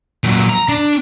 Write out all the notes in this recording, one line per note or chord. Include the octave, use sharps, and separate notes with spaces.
A#2 F#3
A#5
D4